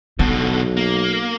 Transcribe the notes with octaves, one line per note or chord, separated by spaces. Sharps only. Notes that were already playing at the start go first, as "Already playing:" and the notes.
B1 B2 D3 B3
A#3